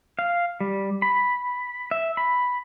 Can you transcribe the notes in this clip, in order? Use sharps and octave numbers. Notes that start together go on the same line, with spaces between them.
F5
G3
B5
E5
B5